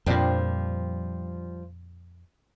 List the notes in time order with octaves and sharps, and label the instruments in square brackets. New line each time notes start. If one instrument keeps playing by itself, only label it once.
[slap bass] F2 A#2 [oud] F3 G3 D4